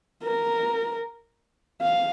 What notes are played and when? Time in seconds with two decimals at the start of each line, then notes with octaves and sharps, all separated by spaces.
0.24 A#4
1.82 F5